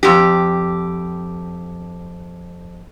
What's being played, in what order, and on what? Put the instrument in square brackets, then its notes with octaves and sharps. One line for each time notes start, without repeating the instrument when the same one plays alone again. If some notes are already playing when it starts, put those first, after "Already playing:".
[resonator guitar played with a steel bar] F2 G4